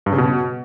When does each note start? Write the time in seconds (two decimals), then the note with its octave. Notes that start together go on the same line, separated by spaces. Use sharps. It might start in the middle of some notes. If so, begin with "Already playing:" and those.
0.06 G2
0.12 C#3
0.18 B2